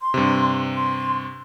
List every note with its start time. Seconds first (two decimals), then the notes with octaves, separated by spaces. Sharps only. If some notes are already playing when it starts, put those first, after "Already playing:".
0.01 C6
0.14 G2 C3
0.75 C6